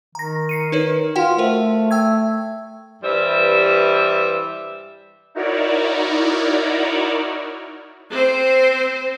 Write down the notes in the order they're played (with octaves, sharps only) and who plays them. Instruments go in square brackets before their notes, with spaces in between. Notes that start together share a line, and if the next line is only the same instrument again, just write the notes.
[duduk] D#3 [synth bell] A#5 A#6
[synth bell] C7 C#7 D#7
D#4 B4 C#5
[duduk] F4 [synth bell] F#4 F#5 G5
[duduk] A3 [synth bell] A#4 C5
[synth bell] G5 E6 G#6
[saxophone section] G2 E3 G3 C5 E5
[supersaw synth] D#4 E4 F#4 A#4 C#5 D5
[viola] C4 C5